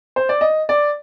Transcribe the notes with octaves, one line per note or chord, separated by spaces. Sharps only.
C5
D5
D#5
D5